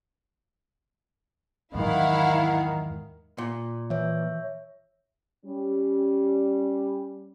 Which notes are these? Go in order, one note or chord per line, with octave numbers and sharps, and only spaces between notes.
E2 G#2 D#3 F#3 E4 F5 F#5
A#2
E3 C#5 E5
G3 C#4